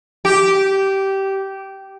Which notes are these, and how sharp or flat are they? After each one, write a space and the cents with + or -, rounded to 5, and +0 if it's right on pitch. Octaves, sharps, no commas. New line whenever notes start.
G4 -15